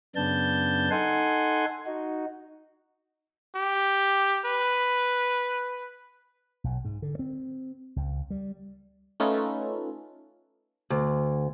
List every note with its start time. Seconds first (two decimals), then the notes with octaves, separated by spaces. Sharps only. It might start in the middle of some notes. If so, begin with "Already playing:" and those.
0.16 F#2 C#3 B3 D4 A5 G6
0.91 D#4 A4 F#5 G#5 C6
1.86 D#4 F#4
3.56 G4
4.45 B4
6.64 B1
6.85 G#2
7.02 D3
7.19 C4
7.96 C#2
8.31 G3
9.20 A3 C#4 D#4 F4 A4 B4
10.90 D2